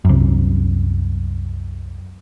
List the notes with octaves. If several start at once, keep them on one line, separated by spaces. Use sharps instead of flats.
C2 F#2